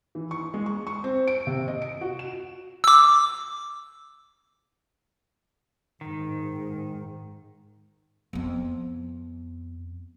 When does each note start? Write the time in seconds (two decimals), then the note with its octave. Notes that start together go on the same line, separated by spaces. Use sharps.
0.15 E3
0.31 C#6
0.54 G#3
0.66 C#6
0.87 C#6
1.04 C4
1.27 D7
1.47 C3
1.68 D#5
1.82 D7
2.01 F#4
2.19 E7
2.84 D6 E6
6.01 G#2 D#3
8.33 F2 B3